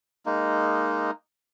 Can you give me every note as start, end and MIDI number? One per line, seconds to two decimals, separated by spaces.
0.26 1.11 56
0.26 1.11 58
0.26 1.11 63